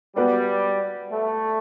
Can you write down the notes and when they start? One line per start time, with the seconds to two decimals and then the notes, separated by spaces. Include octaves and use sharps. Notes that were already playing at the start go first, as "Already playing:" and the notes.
0.16 G3 B3 F#4 B4 D5
1.10 A3